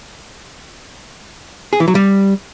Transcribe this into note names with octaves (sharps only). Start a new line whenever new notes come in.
G#4
E3
F#3
G3